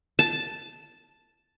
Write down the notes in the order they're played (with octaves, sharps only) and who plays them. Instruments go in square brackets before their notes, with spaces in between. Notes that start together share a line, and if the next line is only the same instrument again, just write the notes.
[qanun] A5